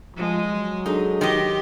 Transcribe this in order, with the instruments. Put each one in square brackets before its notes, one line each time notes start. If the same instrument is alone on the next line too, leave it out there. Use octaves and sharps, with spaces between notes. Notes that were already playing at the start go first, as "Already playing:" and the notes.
[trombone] F3 [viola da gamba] G#3
[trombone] F#3
[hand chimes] D4 G#4 A4 [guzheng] D#4
[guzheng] D#3 D#5 [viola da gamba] G4 [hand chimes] C6